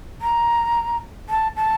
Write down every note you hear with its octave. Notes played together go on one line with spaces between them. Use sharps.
A#5
A5
A5